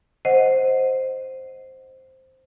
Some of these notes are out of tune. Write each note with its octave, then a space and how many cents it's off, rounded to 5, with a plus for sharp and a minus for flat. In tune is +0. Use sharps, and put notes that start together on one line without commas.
C5 +0 D#5 +0 F#5 +0